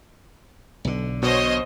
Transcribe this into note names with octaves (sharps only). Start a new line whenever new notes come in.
B1 D3
B2 C5 C#5 D#5